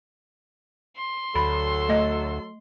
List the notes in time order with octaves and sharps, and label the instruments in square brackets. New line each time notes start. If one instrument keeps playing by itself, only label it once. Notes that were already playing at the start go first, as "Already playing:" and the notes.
[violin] C6
[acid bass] D2 [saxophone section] F#3 A4 [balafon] B5
[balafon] A3 D#5